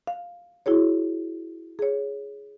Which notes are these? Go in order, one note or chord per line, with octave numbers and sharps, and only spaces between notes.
F5
E4 F#4 G#4 C#5
G#4 C#5